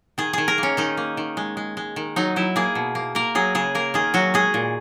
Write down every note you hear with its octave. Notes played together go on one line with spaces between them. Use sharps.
D#3 G#4
D#3 G#4
A#4
A#3
C#4
D#3 D#4
A#3
D#3
G#3
G#3
G#3
D#3
F#3 D#4
F#3 E4
A#3 G#4
B2
A#3
A#3 A#4
F#3 G#4
C#3 G#4
A#3 A#4
D#3 G#4
F#3 F#4
G#3 G#4
A#2